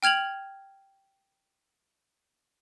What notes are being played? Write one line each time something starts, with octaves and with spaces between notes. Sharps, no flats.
G5 F6 G#6 F7 F#7